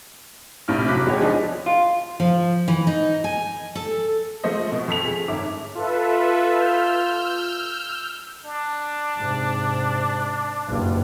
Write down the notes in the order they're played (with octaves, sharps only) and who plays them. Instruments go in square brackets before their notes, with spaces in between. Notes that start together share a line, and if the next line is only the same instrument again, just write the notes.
[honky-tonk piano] A#1 A2 C3 F6
F1 F#3 D6 F#6 B6
E2 C3 G#3 F#4 G4 C#5
F3 D4 D#4 G#4
[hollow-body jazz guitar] F4
[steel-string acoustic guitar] F3
E3
D#4
G#5
A4
[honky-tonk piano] F3 G#3 A3 C5 D#5
B2
F2 A4 B6 F7
G#4
G1 G#2 D#3 C#5 E5 D6
[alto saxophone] F4 [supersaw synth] A4 B4 E5
[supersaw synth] E6 F6 G6
[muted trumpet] D4
[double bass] G#2 C3
F#1 G2